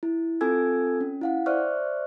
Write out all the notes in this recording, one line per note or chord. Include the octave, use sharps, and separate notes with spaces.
E4
C4 F4 A4 G#5 E6 G#6
C#4
E4 F5 F#5
C5 D5 E5 C#6 F6 F#6